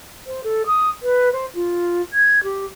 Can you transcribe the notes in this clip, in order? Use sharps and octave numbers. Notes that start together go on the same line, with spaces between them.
C5
A4
D#6
B4
C5
F4
G#6
G4